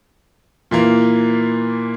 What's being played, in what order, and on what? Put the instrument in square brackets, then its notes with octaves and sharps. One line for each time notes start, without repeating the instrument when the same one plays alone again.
[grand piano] A#2 E3 A#3